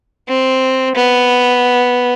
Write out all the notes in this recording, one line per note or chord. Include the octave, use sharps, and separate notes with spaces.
C4
B3